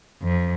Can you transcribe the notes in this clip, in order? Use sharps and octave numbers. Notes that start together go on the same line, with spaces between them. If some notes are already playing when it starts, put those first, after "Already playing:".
F2